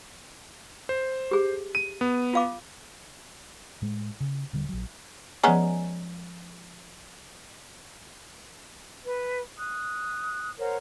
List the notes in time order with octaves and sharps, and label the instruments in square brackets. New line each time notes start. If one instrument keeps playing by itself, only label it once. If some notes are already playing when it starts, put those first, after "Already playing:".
[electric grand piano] C5
[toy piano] G4 G#4
[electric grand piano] D#7
B3
[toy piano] F4 F5 D6
[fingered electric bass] A2 G#3
C#3
D#1 D3 G3
A#1 F#3
[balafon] F3 A#5 [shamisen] G#3 B3 C#4
[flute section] B4
D#6 F#6
A#4 C5 C#5 F#5